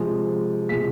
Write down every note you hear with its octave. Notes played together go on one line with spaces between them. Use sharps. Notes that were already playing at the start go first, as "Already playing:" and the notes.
Already playing: C3 F3 G#3
C3 F3 G#3 B6